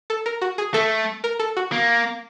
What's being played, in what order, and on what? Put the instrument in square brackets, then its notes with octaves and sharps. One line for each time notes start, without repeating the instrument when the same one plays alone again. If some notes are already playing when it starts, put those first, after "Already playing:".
[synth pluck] A4
A#4
F#4
G#4
[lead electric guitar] A3 [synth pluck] A4
[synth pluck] A#4
A4
F#4
[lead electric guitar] A#3